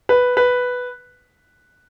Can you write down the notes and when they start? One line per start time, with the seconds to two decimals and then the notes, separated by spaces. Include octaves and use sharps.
0.09 B4
0.37 B4